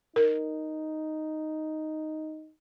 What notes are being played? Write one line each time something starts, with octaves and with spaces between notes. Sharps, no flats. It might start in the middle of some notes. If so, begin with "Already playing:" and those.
D#4 A#4